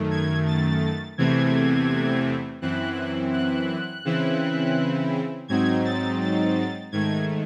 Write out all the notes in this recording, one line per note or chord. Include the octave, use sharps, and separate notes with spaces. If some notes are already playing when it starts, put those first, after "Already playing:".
Already playing: F#2 D#3 A3
G#6
A6
E2 C3 E3 A3 C4 G#6
F#2 E3 C4 E4 F#6
F#6
C#3 E3 C4 E4
G#2 F#3 C4 D#4 G#6
A6
A6
G#2 D#3 A3 G#6